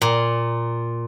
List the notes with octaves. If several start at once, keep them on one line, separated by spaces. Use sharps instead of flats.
A#2